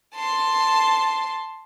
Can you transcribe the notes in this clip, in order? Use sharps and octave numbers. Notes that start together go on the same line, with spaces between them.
A5 C6